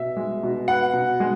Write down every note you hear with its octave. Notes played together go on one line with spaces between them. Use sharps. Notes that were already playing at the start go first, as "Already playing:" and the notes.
Already playing: B2 E5
G#3
B2
B3 F#5
B2
G#3